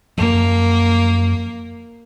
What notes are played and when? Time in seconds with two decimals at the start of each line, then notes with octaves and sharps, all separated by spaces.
0.18 F#2 F3 A#3